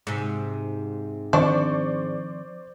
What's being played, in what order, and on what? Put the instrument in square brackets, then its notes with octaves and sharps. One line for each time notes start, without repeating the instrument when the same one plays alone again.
[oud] G#2 C3
[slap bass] D#3 F3 C4 [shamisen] D4 [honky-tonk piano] C5 D5 C#6